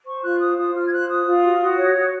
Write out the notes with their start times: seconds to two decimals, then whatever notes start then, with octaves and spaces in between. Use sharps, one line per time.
0.06 C5 C#6
0.23 F4 F#6
0.41 C5 D#6
0.57 F4 D#6
0.74 F4 F6
0.86 G#6
0.92 C5 F#6
1.09 F4 D#6
1.26 F4
1.43 F#4
1.60 F#4
1.77 C#5
1.95 F#4